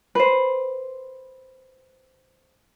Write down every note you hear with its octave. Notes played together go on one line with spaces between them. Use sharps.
B4 C5